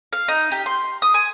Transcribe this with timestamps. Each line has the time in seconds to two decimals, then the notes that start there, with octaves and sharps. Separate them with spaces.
0.13 F5
0.28 D#4
0.52 G4
0.66 C6
1.02 D#6
1.14 G#5